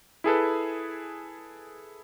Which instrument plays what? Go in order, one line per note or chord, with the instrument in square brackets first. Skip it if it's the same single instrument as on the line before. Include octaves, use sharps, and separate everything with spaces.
[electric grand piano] E4 G#4 A4 B4